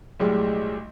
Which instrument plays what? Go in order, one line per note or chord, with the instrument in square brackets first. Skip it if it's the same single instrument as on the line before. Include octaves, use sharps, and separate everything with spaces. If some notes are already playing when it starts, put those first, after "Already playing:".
[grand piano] B1 A2 G3 G#3